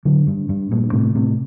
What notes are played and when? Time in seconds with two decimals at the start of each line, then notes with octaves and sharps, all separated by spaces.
0.05 D3 F#3
0.27 G2
0.49 G2
0.71 G2 A#2
0.93 A2 C3
1.15 A2 C3